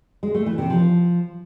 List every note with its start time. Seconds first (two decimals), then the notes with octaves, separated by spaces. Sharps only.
0.23 G#3
0.35 A3
0.46 E3
0.58 C3
0.70 F3